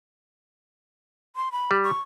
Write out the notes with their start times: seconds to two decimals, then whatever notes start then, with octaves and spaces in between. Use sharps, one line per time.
1.36 C6
1.52 B5
1.71 G3
1.84 C#6